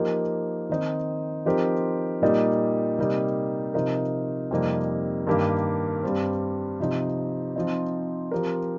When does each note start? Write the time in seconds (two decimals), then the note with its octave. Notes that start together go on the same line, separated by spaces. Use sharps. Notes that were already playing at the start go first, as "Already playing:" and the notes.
Already playing: F3 A#3 D#4 G4 A#4
0.70 D#3 C4 D#4
1.46 F3 C4 D#4 G4 A#4
2.22 A#2 G3 A#3 D#4
2.98 C3 G3 A#3 D#4
3.74 C3 F3 D#4 A#4
4.51 F2 C3 G3 A#3 D#4
5.27 G2 D#3 A#3 G4
6.03 G2 G3 C4
6.80 C3 F3 D#4
7.56 F3 C4 D#4
8.31 F3 C4 G4 A#4